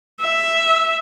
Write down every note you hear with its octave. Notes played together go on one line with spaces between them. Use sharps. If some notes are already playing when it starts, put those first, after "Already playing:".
E5